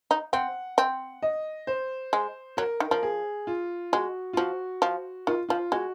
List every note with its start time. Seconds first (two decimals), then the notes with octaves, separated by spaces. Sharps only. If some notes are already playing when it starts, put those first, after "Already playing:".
0.11 D#4
0.33 C4 F#5
0.78 C4
1.23 D#5
1.67 C5
2.13 G#3
2.57 F#3 A#4
2.80 D#3
2.91 F3 A#4
3.03 G#4
3.47 F4
3.93 G#3 F#4
4.33 F4
4.37 F3 F#4
4.82 F3
5.27 D#3 F4
5.49 F3 F4
5.72 G#3 F#4